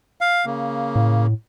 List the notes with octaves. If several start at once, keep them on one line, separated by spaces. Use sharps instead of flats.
F5
C#3 A#3
A2